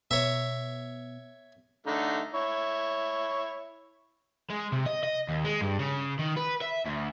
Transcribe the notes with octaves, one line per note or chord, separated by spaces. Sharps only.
B2 B3 C#5 E5
D3 A3 D#4
E4 C#5
G#3
C3
D#5
D#5
D#2
G#3
G2
C#3
D#3
B4
E5
D2